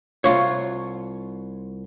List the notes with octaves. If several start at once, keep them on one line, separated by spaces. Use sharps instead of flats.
C2 F4 C#5